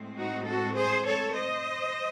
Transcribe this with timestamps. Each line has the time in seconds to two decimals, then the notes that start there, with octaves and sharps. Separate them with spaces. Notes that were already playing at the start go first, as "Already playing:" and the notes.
Already playing: A2 G#3 C4
0.17 D#4 F#4
0.46 F#4 A4
0.76 G#4 C5
1.05 A4 C#5
1.34 C5 D#5